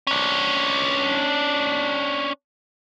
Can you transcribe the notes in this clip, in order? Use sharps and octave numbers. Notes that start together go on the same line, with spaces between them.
C#4 D4